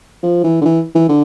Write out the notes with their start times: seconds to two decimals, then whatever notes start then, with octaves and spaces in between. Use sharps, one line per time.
0.23 F3
0.44 E3
0.61 D3
0.65 E3
0.95 E3
1.09 D3